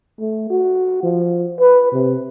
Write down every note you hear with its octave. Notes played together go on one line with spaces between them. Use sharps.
A3
F#4
F3
B4
C3